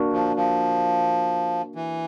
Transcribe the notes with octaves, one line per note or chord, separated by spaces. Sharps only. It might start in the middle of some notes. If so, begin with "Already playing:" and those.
Already playing: A#3 D4 F#4 A#4
F3
F3
E3